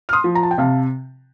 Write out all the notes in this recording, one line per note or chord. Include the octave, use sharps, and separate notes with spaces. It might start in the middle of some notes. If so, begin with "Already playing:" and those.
F6
C6 D#6
F3
A#5
A5
G5
C3 F5 A5